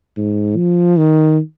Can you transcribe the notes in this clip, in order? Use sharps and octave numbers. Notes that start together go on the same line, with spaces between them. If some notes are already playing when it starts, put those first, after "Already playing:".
G#2
F3
D#3